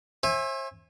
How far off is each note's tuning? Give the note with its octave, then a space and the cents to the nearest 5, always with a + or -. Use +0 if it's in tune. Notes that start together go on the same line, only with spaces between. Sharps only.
C5 +45 E5 +0 G#5 -20